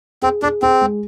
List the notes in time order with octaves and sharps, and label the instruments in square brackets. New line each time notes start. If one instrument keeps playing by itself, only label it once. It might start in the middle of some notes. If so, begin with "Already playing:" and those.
[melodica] C4 [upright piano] G#4
[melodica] D4 [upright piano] G#4
[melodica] C4 [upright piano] G#4
[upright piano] G#3